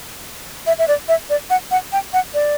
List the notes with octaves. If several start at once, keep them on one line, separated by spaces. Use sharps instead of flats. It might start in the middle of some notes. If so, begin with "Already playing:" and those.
E5
E5
D5
E5
D5
F#5
F#5
G5
F#5
D5